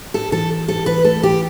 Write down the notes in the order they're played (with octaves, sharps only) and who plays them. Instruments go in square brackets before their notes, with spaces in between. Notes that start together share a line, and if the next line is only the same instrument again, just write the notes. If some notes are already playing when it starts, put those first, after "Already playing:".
[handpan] G4 [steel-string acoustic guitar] A4
[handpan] E3 [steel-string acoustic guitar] A4
[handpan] E3
[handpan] G4 [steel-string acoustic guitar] A4
[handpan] E3 [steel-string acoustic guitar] B4
[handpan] A3 [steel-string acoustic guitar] A4
[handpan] E3 [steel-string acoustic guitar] G4